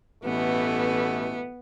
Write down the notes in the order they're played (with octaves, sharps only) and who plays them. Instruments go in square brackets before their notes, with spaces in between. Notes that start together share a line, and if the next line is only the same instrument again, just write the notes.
[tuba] A1 [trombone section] B2 E3 A3 [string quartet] B3